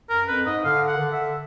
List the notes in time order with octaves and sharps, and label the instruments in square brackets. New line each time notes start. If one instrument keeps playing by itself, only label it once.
[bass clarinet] F#2 [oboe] A#4
[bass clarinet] F2 [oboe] B4
[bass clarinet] G#2 [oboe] D#5
[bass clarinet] D3 [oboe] F5
[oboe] F#5
[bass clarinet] D#3
D3
[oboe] E5